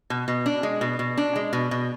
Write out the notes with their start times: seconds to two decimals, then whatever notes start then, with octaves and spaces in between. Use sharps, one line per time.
0.10 B2
0.28 B2
0.46 D4
0.63 G#3
0.81 B2
0.99 B2
1.18 D4
1.36 G#3
1.53 B2
1.71 B2